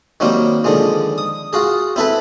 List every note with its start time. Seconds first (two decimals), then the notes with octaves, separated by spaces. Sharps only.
0.20 D#3 F#3 G3 A#3 C4
0.64 D3 D#3 F3 G#3
1.18 D#6
1.53 F4 F#4 G#4
1.96 C4 E4 A4 B4